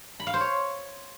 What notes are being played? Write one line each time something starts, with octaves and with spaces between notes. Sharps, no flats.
B5
F5
C5
C#5